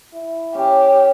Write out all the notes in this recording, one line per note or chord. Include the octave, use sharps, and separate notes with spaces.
E4
C#4 G4